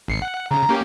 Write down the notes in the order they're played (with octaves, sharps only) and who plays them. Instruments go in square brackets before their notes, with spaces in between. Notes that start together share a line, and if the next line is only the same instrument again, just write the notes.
[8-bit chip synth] G#1 C7 C#7
F#5
[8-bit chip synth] C#3 [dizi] A#5
[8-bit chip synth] A#3 C#4 G4